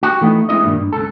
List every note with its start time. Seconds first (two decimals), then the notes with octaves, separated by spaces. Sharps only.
0.03 F#4 G4
0.21 E3 A3 B3 C#4 D#4
0.49 G#3 C4 E4 D#5
0.64 G2 A#2 D#3 G3
0.77 G2
0.93 C#2 A4